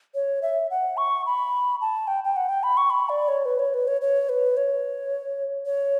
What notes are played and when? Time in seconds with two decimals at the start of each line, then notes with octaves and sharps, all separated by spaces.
0.15 C#5
0.42 E5
0.71 F#5
0.97 C#6
1.26 B5
1.81 A5
2.08 G5
2.24 G5
2.36 F#5
2.49 G5
2.63 B5
2.77 C#6
2.90 B5
3.09 D5
3.28 C#5
3.45 B4
3.59 C#5
3.74 B4
3.88 C#5
4.01 C#5
4.29 B4
4.57 C#5
5.66 C#5